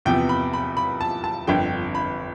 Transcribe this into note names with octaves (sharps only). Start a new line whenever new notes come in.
E2 C3 F3 B3 G5
B5
B5
B5
A5
A5
G1 F2 D3 G5
B5